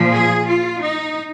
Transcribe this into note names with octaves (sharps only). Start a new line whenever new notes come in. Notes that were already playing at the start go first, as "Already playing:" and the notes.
Already playing: A#2 F3
G#4
F4
D#4